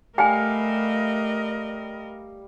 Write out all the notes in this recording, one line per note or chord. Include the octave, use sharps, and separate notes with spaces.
G3 A3 A#4 D#5 F5 G5 G#5